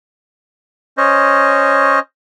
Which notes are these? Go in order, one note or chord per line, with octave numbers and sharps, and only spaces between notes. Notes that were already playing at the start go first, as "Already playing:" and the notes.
C#4 C5 C#5 D#5